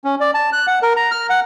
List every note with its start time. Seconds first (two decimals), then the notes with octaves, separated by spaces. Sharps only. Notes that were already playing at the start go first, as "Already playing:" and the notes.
0.04 C#4
0.20 D5
0.34 A5
0.53 F#6
0.67 F#5
0.83 A#4
0.96 A#5
1.11 F6
1.30 F#5